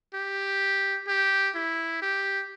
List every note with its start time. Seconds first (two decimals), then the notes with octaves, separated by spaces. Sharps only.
0.14 G4
1.08 G4
1.55 E4
2.02 G4